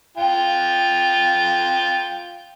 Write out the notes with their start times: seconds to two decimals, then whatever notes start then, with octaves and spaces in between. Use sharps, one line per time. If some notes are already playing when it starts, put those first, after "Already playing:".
0.17 F4 G5